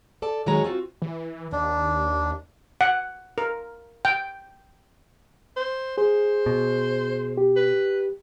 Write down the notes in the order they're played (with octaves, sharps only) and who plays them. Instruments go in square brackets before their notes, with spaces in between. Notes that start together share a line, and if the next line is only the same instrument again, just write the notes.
[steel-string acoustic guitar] A4 D5 A5
D#3 F#3 G#3 F#4 C#5 A#5
C4 F4 F#4
[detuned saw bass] E3
[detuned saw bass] D#2 [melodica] D4
[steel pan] F#5
A#4
G5
[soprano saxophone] C5
[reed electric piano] G#4 [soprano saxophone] C5
[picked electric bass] B2
[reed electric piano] G4
[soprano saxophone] B4